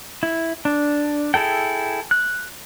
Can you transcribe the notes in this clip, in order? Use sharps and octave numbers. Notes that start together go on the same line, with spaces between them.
E4
D4
E4 G#4 A4 G5
F#6